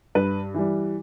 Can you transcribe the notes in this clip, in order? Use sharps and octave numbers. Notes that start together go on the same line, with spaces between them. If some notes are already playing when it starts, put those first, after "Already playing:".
G2 B4
E3 G3